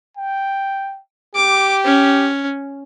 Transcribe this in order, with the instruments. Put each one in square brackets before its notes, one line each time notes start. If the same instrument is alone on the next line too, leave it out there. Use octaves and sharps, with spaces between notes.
[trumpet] G5
[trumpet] G4 [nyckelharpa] D6
[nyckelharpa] C#4